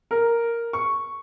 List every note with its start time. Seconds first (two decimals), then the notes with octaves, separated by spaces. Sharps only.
0.11 A#4
0.73 C#6